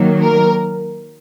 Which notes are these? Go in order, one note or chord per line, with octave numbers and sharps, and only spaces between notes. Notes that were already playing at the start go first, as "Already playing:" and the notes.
Already playing: D#3 F#3 A#3
A#4